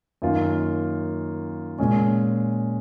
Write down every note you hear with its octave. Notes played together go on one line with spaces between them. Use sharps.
F#2 D#3 A#3 C#4 F4
A#2 G#3 C#4